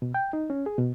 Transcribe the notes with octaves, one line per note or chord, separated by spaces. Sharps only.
B2
G5
D#4
C#4
G#4
B2